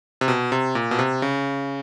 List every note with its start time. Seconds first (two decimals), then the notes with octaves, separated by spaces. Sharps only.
0.21 C3
0.28 B2
0.52 C3
0.75 A#2
0.91 B2
0.99 C3
1.22 C#3